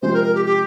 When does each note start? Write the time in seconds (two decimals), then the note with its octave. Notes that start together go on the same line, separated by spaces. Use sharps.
0.02 C3 F3 G#3 C5
0.13 A#4
0.24 A#4
0.35 G4
0.45 G4